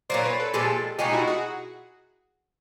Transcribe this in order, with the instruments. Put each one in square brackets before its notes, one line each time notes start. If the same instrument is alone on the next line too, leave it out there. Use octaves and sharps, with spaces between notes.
[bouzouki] A#2 F#3 A#3 [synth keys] C5 D5
[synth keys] B4 C#5
A4 B4
[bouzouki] A#2 F3 G#3 [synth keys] G4 A4
[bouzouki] B2 G#3 B3 D#4 [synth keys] F4 G4
[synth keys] E4 F#4
F#4 G#4